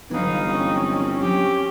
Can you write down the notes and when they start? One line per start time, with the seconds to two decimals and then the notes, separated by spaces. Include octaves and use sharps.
0.11 G1 E3 F#3 D#4 B4 F5
0.46 C4 C#4
1.21 F#3 G4